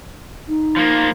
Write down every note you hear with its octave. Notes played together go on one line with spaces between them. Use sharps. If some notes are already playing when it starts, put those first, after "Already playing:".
D#4
F3 A#3